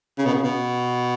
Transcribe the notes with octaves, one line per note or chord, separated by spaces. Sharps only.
C#3
B2
C#3
B2